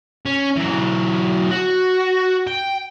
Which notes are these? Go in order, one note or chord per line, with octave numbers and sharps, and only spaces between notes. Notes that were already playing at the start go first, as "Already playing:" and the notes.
C#4
E3 F#3
F#4
G5